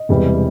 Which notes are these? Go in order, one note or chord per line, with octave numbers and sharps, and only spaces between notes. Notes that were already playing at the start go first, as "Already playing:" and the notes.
Already playing: D#5
E1 E2 C3 E3 G3